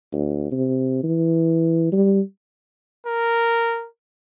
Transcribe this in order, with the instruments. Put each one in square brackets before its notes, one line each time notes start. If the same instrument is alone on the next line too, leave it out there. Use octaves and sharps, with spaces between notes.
[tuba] D2
C3
E3
G3
[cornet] A#4